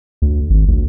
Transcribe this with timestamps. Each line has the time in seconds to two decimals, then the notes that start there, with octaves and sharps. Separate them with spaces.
0.22 D2
0.50 G#1
0.68 D2